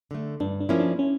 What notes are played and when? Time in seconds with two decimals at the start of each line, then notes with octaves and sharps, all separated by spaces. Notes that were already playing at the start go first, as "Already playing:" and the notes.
0.11 D3 A3
0.40 G2 D4
0.60 D4
0.69 F3 A#3 C#4 E4
0.80 D4
0.99 C#4